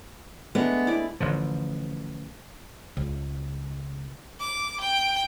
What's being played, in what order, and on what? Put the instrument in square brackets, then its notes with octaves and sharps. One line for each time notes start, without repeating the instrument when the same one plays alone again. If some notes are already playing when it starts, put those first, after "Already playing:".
[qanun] G#3 A3 D4 [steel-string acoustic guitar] B3
[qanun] E4 D5
[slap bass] A1 D3 F3
[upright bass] C#2
[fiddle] D6
G5